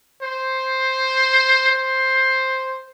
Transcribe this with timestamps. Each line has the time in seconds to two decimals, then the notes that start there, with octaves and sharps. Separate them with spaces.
0.23 C5
1.72 C5